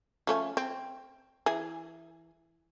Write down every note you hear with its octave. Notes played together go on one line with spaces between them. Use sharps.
F3 A3 C#4
C4
E3 G#4